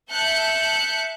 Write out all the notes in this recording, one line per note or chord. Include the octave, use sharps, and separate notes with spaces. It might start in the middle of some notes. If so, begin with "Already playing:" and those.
E5 A5 F#6 G6 C#7